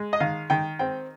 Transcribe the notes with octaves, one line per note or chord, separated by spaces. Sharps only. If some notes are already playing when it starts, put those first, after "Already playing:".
Already playing: G#3
D#5
D#3 F5
D#3 G5
C4 G5